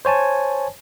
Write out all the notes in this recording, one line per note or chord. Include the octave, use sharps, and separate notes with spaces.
C5 C#5 G#5 A5